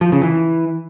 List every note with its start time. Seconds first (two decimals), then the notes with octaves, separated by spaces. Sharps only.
0.01 F3
0.12 C#3
0.23 E3